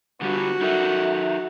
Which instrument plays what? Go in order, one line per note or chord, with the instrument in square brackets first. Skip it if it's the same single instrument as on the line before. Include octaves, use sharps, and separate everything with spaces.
[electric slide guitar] D3 G3 B3 [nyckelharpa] F#4
[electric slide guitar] D#4 A4 A#4 [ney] E5